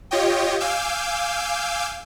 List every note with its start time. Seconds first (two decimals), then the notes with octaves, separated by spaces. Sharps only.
0.11 F4 G4 C#5 D#5 G5
0.60 F5 G#5 D6 E6 G6